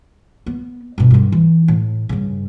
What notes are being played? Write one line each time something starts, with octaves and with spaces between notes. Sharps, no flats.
B3
G2 B2
G2 D3
E3
A2
G2 C#3